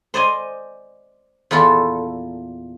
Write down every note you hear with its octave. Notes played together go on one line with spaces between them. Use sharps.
C5 D5 D#5 G#5
E2 A#2 E4 F4 A4